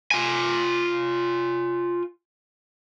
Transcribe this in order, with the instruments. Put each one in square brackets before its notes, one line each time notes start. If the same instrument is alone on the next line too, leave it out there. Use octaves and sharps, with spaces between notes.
[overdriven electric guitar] F4 G#5